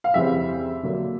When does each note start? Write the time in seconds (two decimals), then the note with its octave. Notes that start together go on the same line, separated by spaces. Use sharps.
0.04 F5
0.14 F2 C#3 E3 G3 C4 E5
0.83 D3 F#3 A#3